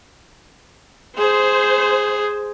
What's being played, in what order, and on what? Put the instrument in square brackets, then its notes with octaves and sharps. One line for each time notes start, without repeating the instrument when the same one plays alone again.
[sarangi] G#4 [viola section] C5